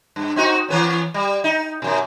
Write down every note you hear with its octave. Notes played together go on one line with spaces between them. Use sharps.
G2
C4 D#4 F#4
E3 B3 C#4
G3
D#4
F#2 B2